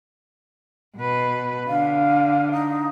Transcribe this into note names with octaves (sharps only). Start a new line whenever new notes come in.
B2 B4
D3 F5
D#4